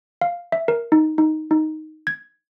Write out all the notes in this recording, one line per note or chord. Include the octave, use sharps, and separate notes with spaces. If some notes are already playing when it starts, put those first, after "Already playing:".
F5
E5
A#4
D#4
D#4
D#4
G#6